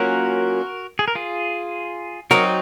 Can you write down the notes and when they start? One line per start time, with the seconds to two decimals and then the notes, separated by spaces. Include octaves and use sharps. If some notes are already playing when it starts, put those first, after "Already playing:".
Already playing: F#3 A#3 C#4 F4 F#4 A#4
0.99 G#4
1.08 A#4
1.15 F4 G#4
2.31 F#3 C4 D#4 F#4 A#4